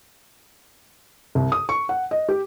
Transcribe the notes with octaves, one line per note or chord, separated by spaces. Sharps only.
C2
D#6
C#6
F#5
D#5
G4